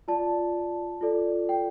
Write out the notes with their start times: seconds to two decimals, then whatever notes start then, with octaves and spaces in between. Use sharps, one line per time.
0.08 F4 D5 A5
1.01 F4 A4 D5
1.49 G5